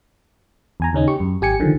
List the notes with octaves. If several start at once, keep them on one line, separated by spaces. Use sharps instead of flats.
E2 G#5 A#5
D#2 C#3 C#4 D#4
G4 C#6
F#2
G#1 G4 G#5 C#7
C#2 D3 D#3 F3